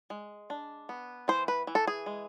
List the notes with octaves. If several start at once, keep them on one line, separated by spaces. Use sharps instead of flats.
G#3
D4
B3
E3 C5
B4
E3
A4
G#4
G#3